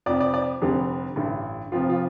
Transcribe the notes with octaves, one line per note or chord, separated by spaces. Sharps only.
F1 F2 F3 D5
D5
D5
F1 F2 D3 G3
A1 G2 D3
F1 F2 F3 F4
F4